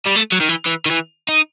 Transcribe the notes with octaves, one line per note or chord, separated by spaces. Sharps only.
G3
A3
F#3
D#3
E3
E3
D#3
E3
D#4